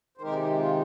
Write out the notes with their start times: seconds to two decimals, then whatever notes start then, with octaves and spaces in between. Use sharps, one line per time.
0.17 C5
0.21 C3 D#3 G#3 D#4 G4 A#4
0.39 G4
0.59 F4